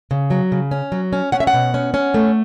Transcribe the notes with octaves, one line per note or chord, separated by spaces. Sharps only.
C#3
F#3
C#3
C#4
F#3
C#4
C#4 F#5
E5
F#5
B2
C#4
C#4
A3